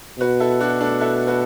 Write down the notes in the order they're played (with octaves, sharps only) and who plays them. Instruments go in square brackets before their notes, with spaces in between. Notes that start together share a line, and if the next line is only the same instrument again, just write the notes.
[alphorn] B2 [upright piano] F#4 B4
[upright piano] E4 A4
D4 F#4
A3 D4
E4 A4
F#4 B4